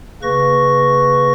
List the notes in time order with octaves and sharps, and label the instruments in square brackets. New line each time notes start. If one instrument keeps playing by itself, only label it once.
[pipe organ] C#3 A#3 B4 C#6 A#6